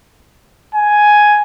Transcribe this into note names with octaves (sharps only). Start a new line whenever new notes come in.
G#5